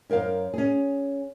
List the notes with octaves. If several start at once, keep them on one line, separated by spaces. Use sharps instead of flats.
F#2 A#4 C5 F5
C#4 G#4